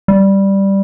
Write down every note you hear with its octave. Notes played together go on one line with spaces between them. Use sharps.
G3